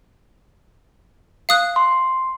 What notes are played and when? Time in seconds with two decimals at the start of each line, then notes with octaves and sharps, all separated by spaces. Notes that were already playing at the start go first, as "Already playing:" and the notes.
1.49 F5 D#6 F#6
1.76 C6